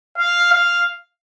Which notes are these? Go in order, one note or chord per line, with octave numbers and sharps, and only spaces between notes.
F5
F5